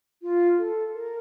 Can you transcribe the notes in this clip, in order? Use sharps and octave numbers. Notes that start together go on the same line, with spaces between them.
F4
A4
A#4